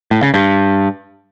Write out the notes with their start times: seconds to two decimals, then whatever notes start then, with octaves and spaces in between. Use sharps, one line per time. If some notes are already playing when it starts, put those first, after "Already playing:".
0.11 A2
0.22 C#3
0.34 G2